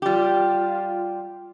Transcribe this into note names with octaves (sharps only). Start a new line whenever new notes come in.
G3 F4 G4